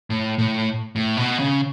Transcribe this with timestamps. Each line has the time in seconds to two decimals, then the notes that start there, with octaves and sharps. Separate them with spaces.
0.10 A2
0.38 A2
0.96 A2
1.17 B2
1.39 C#3